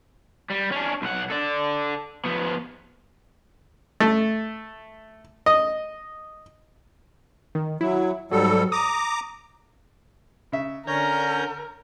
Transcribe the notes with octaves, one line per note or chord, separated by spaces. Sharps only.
G3
C#4 D4
B1 F#5
A4 D5
F3 B3
A3
D#5
D#3
F#3 E4
G#2 F#3 G3 A4
A#5 D6 D#6
C#3 E5
D3 C#4 A#4 C#5 A#5 G6